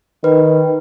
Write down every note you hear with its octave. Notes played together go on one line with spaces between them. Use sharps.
D#3 B4